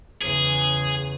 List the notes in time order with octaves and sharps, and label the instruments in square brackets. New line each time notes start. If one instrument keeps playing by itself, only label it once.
[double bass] E2 C#3 [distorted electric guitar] G#4